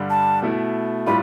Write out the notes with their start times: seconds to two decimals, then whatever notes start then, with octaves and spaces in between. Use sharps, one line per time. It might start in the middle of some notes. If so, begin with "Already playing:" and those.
Already playing: G2 D3 G3
0.10 A5
0.42 B2 A3 E4
1.06 A2 G3 D4 F4 B5